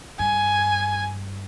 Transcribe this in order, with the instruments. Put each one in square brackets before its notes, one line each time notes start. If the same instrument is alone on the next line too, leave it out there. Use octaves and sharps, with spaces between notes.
[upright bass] G2 [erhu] G#5